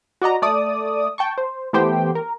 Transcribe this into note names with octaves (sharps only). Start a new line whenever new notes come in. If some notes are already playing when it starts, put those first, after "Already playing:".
F#4 D5 D#5 A#5
A3 D5 D#6
G5 A5 C#6
C5
E3 A3 B3 G4 C5 G5
A#4